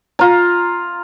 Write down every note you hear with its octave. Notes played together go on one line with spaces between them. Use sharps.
F4 A#5